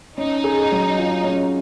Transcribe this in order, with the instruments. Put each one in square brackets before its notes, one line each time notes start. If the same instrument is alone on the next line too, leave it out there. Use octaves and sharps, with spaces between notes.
[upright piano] C#4 [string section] D#4
[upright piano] G#4
F#3
F4
C#4